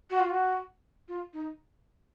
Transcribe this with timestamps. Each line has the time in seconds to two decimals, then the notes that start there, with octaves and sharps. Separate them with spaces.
0.10 F#4
0.20 F4
0.30 F#4
1.08 F4
1.34 D#4